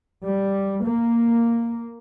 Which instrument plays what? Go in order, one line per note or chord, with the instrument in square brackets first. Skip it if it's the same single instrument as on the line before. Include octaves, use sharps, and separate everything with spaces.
[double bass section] G3
A#3